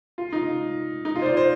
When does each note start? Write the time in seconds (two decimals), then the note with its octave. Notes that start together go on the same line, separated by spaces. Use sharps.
0.18 F4
0.32 D#4
1.05 D#4
1.16 F4
1.22 C5
1.26 D5
1.37 C5